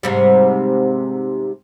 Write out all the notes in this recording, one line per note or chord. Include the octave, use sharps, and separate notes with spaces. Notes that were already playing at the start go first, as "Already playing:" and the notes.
G#2 C3 G3